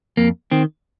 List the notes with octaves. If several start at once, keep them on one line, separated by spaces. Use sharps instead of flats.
F2 A#3
D#3 C4